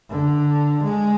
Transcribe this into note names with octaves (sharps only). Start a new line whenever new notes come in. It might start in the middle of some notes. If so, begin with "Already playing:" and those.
D3
G#3